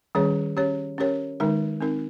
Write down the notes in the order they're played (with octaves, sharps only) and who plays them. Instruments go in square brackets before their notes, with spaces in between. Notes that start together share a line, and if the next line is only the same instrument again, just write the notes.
[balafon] D#3 G3 C#4 G#4 C#5
C#4 G4 C#5
C#4 G4 A#4 C#5
D#3 G#3 D#4 A#4
C4 D#4 A#4